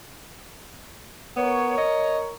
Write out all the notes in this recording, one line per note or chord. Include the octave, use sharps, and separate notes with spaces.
B3 A#4 C#5
D#5